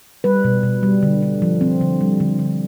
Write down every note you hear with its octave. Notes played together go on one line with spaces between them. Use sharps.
G3 B4
B2
B2
G3
D3
D3
F3
C4
D3
G3
D3
D3